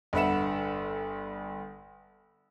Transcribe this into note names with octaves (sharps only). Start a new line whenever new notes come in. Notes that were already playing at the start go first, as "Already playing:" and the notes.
G1 D3 B4 E5 F#5 E7